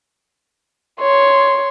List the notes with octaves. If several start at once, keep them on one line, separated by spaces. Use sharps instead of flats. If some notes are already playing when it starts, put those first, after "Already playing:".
C#5 C6